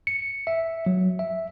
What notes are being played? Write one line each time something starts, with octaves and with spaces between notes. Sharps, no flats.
C#7
E5
F#3
E5